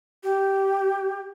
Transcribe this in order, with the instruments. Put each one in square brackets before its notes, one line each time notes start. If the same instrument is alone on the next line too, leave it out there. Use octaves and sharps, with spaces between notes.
[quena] G4